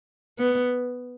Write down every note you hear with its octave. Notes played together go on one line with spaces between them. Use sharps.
B3